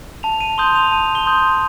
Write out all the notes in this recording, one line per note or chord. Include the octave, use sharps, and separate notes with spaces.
A5 F7
D#7
C6 D#6 G6 G7
F7
A5 D#7
G7
C6 D#6 G6